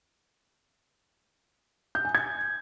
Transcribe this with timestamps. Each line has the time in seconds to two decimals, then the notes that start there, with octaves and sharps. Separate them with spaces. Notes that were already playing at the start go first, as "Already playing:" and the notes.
1.95 G6
2.05 G#5
2.15 G#6